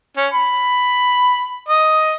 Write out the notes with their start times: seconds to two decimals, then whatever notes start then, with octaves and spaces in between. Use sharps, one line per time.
0.17 C#4
0.34 B5
1.68 D#5